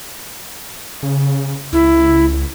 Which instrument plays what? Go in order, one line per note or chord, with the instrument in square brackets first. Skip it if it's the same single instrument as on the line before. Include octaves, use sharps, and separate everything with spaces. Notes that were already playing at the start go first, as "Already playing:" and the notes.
[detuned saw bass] C#3
[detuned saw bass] C#2 [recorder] E4